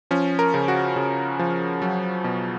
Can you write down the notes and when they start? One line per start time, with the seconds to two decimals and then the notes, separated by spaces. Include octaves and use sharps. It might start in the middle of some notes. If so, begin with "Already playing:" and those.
0.11 F3 C#4
0.39 A#4
0.54 C#3
0.68 F#4
0.96 C#3
1.39 F3
1.82 F#3
2.24 B2